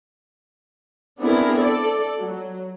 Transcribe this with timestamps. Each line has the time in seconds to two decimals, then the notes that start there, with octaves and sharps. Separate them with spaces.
1.19 B3 C4 D4 E4 G#4 A#4
1.56 A4 D5
2.18 F#3